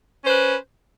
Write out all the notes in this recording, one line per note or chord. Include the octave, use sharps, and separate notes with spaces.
C#4 B4 C5